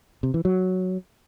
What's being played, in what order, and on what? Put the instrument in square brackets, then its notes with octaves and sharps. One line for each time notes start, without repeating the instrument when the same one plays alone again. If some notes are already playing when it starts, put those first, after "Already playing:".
[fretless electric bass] C3
E3
F#3